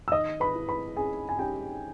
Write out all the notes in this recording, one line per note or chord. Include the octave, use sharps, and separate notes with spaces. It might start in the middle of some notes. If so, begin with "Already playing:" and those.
E6
D#3 D#5 D#6
B4 B5
E4
B4 B5
C#4 G#4 G#5
G#5
C#4 G4 G5